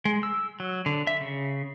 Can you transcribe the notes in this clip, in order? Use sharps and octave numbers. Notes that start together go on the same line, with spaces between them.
G#3
E6
F#3
D3
E5
C#3